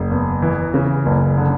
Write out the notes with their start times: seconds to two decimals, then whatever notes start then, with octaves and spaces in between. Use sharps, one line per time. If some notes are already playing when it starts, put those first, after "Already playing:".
Already playing: F#1
0.11 E2
0.42 E3
0.74 C#3
1.06 F#1
1.37 D3